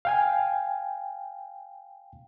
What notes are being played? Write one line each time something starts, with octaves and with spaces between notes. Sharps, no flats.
F5 G5 G#5